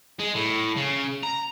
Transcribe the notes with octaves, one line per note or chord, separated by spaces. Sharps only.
G#3
A2
C#3
A#5